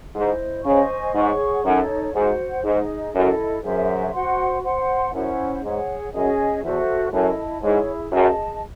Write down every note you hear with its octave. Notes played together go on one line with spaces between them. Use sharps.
G#2 E4 C5 D#5
C#3 C5 D#5 G#5 C#6
G#2 G#4 C#5 F#5 C#6
F#2 D#4 A4 C#5
G#2 F#4 C5 F#5
G#2 D#4 G#4 D#5
F#2 E4 A4 D#5
F#2 G#4 C5 E5
F#4 C5 F#5 C6
C5 F#5 C6
F#2 C#4 E4 C5 F#5
G#2 G#4 C#5 F#5
F#2 C#4 G#4 D#5 G#5
E2 F#4 A4 C5 E5
F#2 E4 A4 D#5 A5
G#2 E4 G#4 C#5
F#2 G#4 D#5 A5